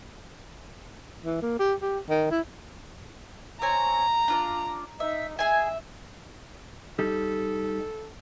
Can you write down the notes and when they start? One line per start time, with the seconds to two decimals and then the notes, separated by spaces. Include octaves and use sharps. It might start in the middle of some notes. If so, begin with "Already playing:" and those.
1.25 E3
1.42 A#3
1.59 G4
1.82 G4
2.09 D#3
2.31 E4
3.62 C4 C#5 G#5 A#5
4.28 D4 F4 D5
5.00 D#4 E5
5.39 G#4 E5 G#5
6.99 G3 D#4 G4 A4